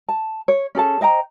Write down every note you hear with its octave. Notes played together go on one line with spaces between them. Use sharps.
A5
C#5
C#4 G#4 A4 A5
C5 D#5 G5 A#5